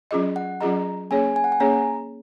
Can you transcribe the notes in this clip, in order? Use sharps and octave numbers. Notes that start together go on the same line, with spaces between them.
F#3 C#4 F4 G#4 D#5
F#5
F#3 C#4 F4 G#4 D#5 A#5
A#3 C#4 G#4 C#5 G#5
G#5
F#5
G#5
A#3 C#4 G#4 C#5 A#5